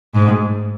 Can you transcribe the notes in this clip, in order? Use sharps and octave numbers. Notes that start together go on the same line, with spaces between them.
G#2